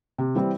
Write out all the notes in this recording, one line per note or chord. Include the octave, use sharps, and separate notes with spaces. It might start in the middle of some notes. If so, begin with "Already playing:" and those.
C3
E3 G3 C4 E4